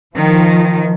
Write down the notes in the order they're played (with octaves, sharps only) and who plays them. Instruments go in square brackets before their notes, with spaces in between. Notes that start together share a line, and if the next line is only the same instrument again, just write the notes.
[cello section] D#3 [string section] F3